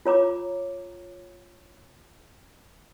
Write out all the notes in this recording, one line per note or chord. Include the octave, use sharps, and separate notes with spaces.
F4 C#5 A#5 D6